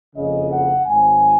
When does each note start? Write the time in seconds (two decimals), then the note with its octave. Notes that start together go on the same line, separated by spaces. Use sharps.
0.15 F#1 F2 C#3 D#5
0.50 F#5
0.85 G#1 G#2 F#3 C4 G#5